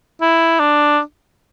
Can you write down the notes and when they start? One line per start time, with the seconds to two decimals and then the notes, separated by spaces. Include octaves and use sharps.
0.21 E4
0.60 D4